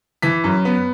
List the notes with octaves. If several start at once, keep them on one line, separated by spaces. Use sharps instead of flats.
E3 B6
F#2
B3